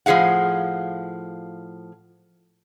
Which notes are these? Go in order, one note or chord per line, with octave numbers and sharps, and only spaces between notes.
A2 F3 G#4 F5 F#5